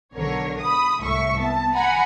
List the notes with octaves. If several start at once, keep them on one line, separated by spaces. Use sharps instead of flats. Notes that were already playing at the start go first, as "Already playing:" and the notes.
B1 D3 A#4 C#5
B5 D#6
C2 A2 E5 C#6
B3 A5
F#5 G#5 A#5 B5